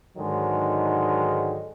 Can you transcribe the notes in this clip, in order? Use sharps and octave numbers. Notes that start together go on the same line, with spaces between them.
G#2 D3 D#3 F#3 G#3